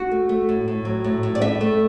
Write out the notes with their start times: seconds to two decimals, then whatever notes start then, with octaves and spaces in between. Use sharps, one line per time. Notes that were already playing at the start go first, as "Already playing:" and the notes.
Already playing: F#4
0.11 A3
0.29 A3
0.49 A2
0.68 A2
0.85 F#3
1.04 A2
1.23 A2
1.35 D5
1.41 A2 E5
1.61 A3